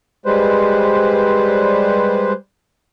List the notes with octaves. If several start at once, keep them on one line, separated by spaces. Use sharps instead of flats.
G3 G#3 B4 C5